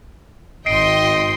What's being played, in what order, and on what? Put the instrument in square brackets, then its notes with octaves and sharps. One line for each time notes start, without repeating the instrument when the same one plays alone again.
[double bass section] G#1 [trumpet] D#5 [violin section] G5 C6 [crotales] C7 D7